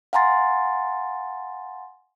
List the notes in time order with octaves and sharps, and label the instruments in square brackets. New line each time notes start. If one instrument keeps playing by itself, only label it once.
[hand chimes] F5 F#5 G#5 A#5 C6 A6